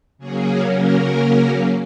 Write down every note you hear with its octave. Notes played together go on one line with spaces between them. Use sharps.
C#3 F#3 A#3 C#4 G#4
A#4